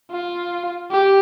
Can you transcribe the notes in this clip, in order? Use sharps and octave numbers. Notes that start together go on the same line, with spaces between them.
F4
G4